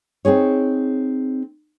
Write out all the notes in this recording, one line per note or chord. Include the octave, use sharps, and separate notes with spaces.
C4 D#4 G#4 C#5